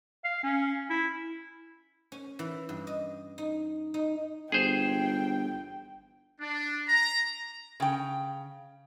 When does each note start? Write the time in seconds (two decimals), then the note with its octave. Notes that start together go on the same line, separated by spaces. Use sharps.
0.24 F5
0.43 C#4
0.90 E4
2.12 C#4
2.39 E3
2.69 G2
2.87 D#5
3.38 D#4
3.94 D#4
4.52 G1 G#4 C5 G5
6.40 D4
6.88 A#5
7.80 C#3 G5